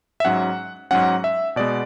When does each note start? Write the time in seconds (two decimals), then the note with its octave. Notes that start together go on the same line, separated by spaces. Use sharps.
0.20 E5
0.25 G#2 F#3 C#4 F#5
0.91 G#2 F#3 C#4 F#5
1.24 E5
1.56 B2 G#3 B3 D5